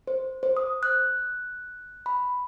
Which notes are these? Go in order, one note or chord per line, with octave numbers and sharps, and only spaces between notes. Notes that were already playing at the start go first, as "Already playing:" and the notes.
C5
C5
D#6
F#6
B5